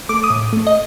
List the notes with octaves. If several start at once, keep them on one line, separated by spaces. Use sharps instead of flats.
A3 D6
D#6
A2
A3
D#5